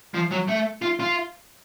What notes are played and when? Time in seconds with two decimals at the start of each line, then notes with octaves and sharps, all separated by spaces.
0.14 F3
0.31 F#3
0.48 A3
0.82 F4
1.00 F4